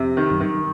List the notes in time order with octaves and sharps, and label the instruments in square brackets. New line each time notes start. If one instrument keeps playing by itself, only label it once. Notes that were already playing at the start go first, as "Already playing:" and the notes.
Already playing: [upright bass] F2 [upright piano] C3
[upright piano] D#3
[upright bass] F#2
[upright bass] G2 [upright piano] D#3